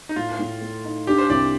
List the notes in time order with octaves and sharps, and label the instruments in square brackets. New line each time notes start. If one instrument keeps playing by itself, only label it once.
[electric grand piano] D#4
[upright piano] A2 [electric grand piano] F4
[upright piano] A2
A3
D#4
[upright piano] D4 [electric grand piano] G4
[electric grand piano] C5
[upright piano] C2 [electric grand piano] D5